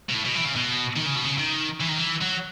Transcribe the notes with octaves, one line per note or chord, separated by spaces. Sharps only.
B2
A2
B2
E3
C#3
B2
D#3
C#3
B2
C#3
D#3
E3
D#3
E3
F#3